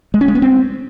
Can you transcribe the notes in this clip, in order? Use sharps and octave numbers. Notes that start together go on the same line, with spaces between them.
G#3
C#4
G#3
B3
C4